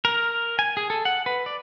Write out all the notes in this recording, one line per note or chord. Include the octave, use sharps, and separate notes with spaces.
A#4
G#5
G#4
A4
F#5
B4
D5